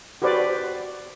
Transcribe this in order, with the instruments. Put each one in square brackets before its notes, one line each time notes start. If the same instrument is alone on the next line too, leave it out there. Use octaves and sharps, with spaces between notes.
[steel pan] F#4 G4 B4 C5 D5